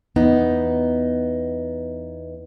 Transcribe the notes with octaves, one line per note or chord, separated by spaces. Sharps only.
E2 B3 D#4